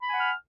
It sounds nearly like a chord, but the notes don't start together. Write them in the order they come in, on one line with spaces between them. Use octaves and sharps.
B5 G#5 F#5 F6